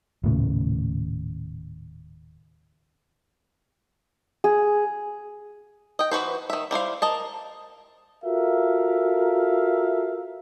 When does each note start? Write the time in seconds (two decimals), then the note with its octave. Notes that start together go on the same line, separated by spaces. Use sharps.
0.23 D#1 A2 C#3
4.44 G#4
5.99 D#5 G5
6.11 E3 F#4 B4 C5
6.50 D#3 E5
6.71 G3 E4 C5 F5
7.02 A#4 D#5 A5
8.25 F4 F#4 A4 A#4 E5 F5